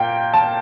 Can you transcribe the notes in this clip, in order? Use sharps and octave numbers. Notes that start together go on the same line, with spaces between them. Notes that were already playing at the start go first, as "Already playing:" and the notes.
Already playing: A#2 A#3 G5
A5